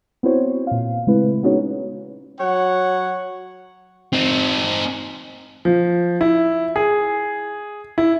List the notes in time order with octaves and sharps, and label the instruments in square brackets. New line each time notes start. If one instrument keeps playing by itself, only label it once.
[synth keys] B3 C4 E4 F#4 C5 C#5
A#2 F5
C#3 G#3 A3 C4 E4 B4
B3 C#4 D#4 F#4 G#4 C#5
[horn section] F#3 C#5 F#5
[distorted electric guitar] C4 D#4
[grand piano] F3
E4
G#4
E4